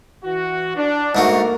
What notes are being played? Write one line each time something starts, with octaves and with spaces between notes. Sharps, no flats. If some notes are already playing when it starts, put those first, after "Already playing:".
E3 F#4
D4
G#2 A3 A#3 F#4 A#4